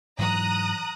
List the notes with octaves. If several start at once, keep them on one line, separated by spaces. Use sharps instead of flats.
G#2 E3 F#3 A#5 D#6 F#6